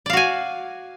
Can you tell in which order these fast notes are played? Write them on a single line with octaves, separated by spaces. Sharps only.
D5 F5 F#4 G#5